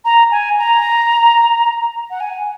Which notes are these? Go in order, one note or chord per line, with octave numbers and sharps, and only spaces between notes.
A#5
G#5
A#5
F#5
G#5